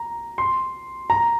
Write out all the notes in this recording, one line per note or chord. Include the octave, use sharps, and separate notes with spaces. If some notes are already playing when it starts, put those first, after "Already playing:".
Already playing: A#5
C6
A#5